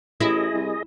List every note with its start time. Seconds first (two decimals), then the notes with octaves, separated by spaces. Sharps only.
0.21 A1 E4 G#4 D#5
0.54 C2